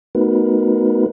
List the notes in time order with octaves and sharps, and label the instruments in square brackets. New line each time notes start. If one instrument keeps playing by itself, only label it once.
[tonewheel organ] A3 B3 D#4 F#4 A#4 B4